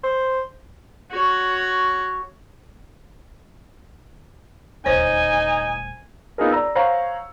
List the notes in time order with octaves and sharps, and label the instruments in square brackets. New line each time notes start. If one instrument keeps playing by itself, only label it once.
[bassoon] C5
[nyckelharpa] F#4 C#5
[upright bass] D#1 D2 [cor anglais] D#4 [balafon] C5 C#5 [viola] G#5
[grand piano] A#3 B3 D#4 F4 G#4 A#4
D5 A#5 E6
C5 C#5 F5 F#5 A#5